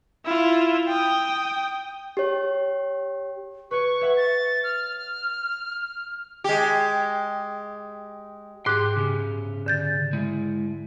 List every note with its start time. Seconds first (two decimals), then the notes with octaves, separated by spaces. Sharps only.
0.25 E4 F4
0.88 G5 D#6
2.17 G4 C#5
3.71 B4 C#5 C#6
4.01 C#5 E5 F#5
4.17 A6
4.64 F6
6.44 G#3 G4
8.66 G#2 G4 C6 D6 F#6
8.97 C#3 G4
9.66 D3 G6 A6
10.13 G#3 E4